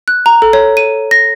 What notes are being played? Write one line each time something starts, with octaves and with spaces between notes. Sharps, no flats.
F#6
A#5
A4
C#5
D#7
A#6